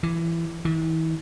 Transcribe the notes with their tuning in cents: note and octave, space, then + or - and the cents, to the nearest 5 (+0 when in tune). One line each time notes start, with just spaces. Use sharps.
E3 +20
E3 -35